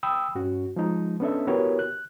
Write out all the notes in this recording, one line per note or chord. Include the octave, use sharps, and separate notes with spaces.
G5 B5 D#6 E6
G2 C#4 F#4
F3 G#3 D#4
B3 C#4 D4 A4 D#5 E5
B3 E4 F#4 G4 A#4 C#5
F#6